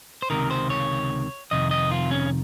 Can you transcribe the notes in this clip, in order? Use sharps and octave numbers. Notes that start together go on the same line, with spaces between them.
C5
C#2 C3 D#3 A#4
C5
C#5
F2 C3 D#3 D#5
D#5
F4
C#4